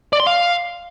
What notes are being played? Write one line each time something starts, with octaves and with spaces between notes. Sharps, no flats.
D5
C6
F5